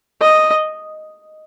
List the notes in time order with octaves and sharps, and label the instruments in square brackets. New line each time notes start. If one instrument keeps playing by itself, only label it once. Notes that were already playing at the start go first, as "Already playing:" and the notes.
[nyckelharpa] D#5